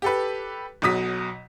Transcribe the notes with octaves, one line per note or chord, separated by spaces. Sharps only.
G4 A4 B4
B1 B2 F#3 D#6 B6